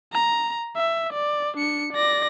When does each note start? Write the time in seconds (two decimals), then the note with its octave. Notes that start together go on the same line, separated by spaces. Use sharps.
0.13 A#5
0.76 E5
1.13 D5
1.57 D4 C#7
1.93 D5 A#6